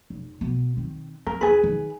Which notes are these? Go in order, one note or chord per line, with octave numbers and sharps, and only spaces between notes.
F1
B2 B3
D#3 C4
C4 A#4
D#2 G#4 B4
D#3